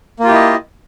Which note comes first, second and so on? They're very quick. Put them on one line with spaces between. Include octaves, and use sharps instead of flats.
A#3 F4 G4 E4 D#5